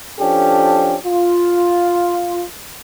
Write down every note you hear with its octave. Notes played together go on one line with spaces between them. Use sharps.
F3 C#4 D4 G4 A4
F4